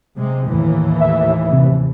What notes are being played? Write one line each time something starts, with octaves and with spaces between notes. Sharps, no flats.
C3 G#3
D#2 A2 E3
E5
C3